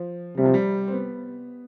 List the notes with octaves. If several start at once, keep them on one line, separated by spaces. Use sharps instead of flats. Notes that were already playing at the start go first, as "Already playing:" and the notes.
Already playing: F3
C3 G3
F3
G3
C4
B3